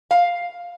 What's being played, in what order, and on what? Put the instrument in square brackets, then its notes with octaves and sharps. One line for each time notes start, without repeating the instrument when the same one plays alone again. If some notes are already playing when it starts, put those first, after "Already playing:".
[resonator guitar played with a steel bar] F5